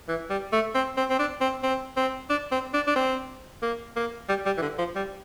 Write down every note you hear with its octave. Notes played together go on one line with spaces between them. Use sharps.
E3
G3
A3
C4
C4
C4
D4
C4
C4
C4
D4
C4
D4
D4
C4
A#3
A#3
G3
G3
E3
D3
F3
G3